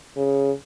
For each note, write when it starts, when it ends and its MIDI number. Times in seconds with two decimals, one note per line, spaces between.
0.17 0.51 49